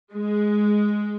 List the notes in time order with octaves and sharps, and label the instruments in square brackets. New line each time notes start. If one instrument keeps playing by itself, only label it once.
[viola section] G#3